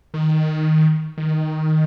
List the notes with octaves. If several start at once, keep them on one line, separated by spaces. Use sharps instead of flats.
D#3
D#3